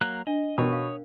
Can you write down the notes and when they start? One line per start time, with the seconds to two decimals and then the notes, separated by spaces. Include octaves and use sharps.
0.01 F#3 A#3 F#6
0.27 D4 D#5
0.58 B2 A#4 C#5 G5 D#6
0.73 F5